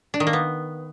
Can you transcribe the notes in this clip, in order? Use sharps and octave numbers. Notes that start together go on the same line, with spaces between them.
D4
D#3
A#3
B3